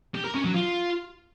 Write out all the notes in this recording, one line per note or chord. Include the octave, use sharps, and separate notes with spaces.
G4
A#4
C#4
F#3
F4